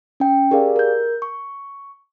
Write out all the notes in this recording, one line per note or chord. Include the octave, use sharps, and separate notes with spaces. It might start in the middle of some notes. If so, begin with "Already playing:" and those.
C#4 G5
G4 G#4 A#4 D5 F5
A#4 G6
C#6